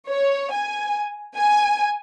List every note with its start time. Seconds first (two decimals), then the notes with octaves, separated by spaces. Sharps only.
0.09 C#5
0.52 G#5
1.37 G#5